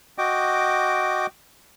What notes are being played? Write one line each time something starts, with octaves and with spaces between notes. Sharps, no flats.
F#4 D#5 G5 D6